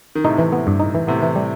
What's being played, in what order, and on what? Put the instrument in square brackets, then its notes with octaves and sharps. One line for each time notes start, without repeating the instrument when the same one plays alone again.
[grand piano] D#3
[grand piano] A2 C3 [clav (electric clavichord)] D#4
[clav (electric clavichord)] E3
B3
G2
D#4
E3
[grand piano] A2 C3 [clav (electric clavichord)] B3
[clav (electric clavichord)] E3
G3